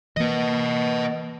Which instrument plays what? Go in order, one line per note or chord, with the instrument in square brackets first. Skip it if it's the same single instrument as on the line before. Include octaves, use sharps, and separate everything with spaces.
[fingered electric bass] E3 A#3 [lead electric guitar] B4 D#5